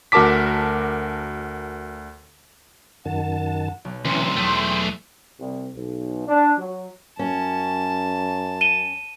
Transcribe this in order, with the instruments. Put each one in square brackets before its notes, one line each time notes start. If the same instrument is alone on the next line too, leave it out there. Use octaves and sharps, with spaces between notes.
[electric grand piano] D2 F#4 A#4 A5 D6 B6
[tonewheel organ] F#2 D#3 A5 [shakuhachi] F#5
[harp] B1
[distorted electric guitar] D2 C3 [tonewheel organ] E3 C#4 [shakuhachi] C6
[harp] E2 F#3 [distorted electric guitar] A3 G#4 [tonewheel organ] G5 G6
[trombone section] C2
B1
D4
F#3
[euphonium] F#2 [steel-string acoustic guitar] C#4 [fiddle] A5
[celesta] D#7 E7 G7